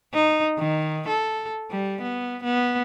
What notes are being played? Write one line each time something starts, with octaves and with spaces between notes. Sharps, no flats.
D#4
D#3
A4
G3
B3
B3